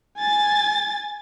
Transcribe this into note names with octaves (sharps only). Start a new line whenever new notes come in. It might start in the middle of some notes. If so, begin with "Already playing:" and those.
G#5 A6